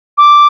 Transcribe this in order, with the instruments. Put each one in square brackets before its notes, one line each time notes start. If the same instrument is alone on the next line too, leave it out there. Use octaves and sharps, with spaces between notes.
[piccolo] D6